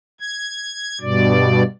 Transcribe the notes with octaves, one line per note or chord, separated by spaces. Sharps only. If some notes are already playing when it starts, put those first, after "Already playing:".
G#6
G2 B2 D5